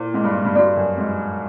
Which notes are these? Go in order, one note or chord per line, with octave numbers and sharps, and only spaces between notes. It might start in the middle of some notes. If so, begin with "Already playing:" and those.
Already playing: A#2 E4 A4 C5
G#2
G2
G2
G2 F#4 A4 D5
F#2
G#2